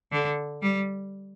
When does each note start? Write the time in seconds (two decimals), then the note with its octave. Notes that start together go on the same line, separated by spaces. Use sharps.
0.12 D3
0.62 G3